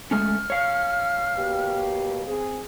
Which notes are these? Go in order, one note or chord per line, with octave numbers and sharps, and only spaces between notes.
G#3 A3 C#4 F6
C#5 F5
B2 A#3 G4
C4 G#4